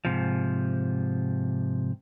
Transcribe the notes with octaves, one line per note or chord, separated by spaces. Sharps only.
G#2 C3 F3